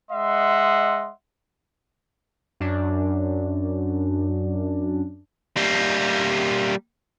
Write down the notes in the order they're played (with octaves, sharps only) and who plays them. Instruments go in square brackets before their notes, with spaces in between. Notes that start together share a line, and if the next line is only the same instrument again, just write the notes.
[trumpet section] G#3 D#5 E5 F#5 C6
[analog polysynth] F#2 D4
[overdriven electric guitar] G3 A#3